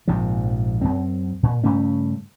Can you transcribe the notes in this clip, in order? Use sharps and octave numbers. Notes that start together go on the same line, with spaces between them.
A#1 G#2 C3 F3
F#2 C4
A#2
G2 C#3 A3 C#4